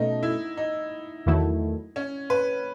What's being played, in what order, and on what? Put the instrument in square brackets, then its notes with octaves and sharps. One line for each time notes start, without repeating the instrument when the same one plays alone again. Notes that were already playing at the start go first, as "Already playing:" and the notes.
Already playing: [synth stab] B2 A3 C#4 [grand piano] D#4
[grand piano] E4
D#4
[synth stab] E2 D#3 F#3 A3 E4
[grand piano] C#4
B4